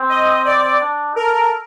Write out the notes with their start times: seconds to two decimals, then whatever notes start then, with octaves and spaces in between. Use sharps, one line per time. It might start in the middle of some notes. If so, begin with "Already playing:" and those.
Already playing: C4
0.09 D#5
0.45 D5
0.80 D4
1.15 A4 A#4